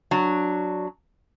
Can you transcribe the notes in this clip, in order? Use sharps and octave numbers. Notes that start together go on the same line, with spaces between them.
F#3 D4